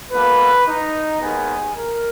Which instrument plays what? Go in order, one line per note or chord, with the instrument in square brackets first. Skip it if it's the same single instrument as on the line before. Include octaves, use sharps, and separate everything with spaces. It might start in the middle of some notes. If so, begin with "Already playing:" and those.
[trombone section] B1 B2 A#3 B4
D#4
D#2 D#3 G#3 B3 G#4
A#4